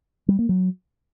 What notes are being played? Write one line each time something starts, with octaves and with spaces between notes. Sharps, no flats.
G3
A#3
F#3